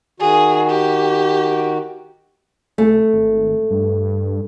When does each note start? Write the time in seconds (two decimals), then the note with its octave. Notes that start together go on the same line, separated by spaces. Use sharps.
0.20 D#3 F#4 G#4
0.70 G4
2.78 C2 A3
3.13 G#1
3.71 G2